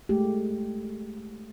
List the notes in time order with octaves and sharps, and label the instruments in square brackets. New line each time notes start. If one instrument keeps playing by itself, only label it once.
[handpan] G#3 A3 G4